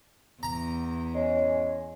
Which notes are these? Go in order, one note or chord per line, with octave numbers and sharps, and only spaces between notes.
E2 A#5
G#3 C#4